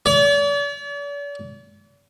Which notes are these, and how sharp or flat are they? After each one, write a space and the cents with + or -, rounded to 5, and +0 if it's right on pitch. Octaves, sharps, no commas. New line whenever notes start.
D5 -45